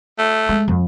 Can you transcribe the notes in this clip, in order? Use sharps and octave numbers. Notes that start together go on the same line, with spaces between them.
A3
G#3
F2